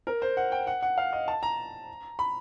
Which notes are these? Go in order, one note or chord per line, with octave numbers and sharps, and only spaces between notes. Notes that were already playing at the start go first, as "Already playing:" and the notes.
A#4
C5
F#5
G5
F#5
F#5
F5
D#5
A5
A#5
B5